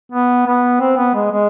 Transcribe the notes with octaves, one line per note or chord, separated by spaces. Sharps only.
B3
B3
C4
B3
G#3
G#3